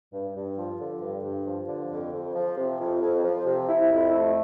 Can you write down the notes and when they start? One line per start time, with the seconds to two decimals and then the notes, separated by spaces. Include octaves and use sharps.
0.12 G2
0.35 G2
0.57 F3
0.79 D3
1.01 G2
1.24 G2
1.46 F3
1.68 D3
1.91 F2
2.12 F2
2.35 F3
2.57 C3
2.79 F2
3.01 F2
3.23 F3
3.45 C3
3.68 E4
3.90 F2
4.12 A3